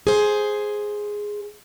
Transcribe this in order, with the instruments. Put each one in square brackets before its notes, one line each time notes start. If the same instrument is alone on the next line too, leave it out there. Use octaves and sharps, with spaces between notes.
[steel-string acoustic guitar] G#4 C5